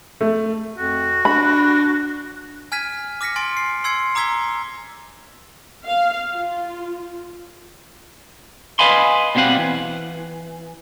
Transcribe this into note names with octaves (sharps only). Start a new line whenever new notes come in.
A3
F2 F#4
D4 B5
G#5 F6 G#6 B6 D#7
D6 F6 A#6 B6 C#7
G#5 C6 A6 D7
C7
C6 E6 G#6 C7 C#7
A#5 D6 E6 G#6 B6 G7
F5
F4
B4 D#5 F5 G#5 B5 C6
B2 G3 C4 F5 F#5
E3